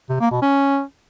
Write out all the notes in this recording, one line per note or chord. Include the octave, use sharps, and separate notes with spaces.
C3
A#3
B2
C#4